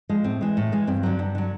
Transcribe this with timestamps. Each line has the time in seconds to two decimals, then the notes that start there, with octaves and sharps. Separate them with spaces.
0.09 F3 G#3
0.24 A2 C4
0.41 E3 G#3
0.57 A2
0.72 E3 G#3
0.87 G2 C4
1.03 D3 F#3
1.19 G2
1.35 D3 F#3